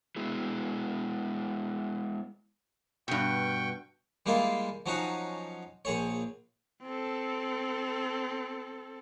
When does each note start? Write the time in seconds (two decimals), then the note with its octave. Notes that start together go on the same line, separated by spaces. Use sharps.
0.16 G#3 B3 E4 G#4
3.08 G2 B2 G5 C#6
4.26 G3 G#3 A#3 E4 F4
4.86 F3 F#3 C#4 D#4 F#4
5.85 A#1 G#4 C#5
6.83 C4 A4